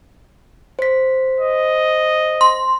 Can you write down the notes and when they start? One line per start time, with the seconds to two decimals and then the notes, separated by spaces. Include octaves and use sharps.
0.79 C5 B6
1.40 D#5
2.41 C6